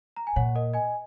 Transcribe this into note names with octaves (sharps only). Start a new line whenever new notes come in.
A#5
G#5
A#2 C#5 F#5
A#4 D#5
D#5 G#5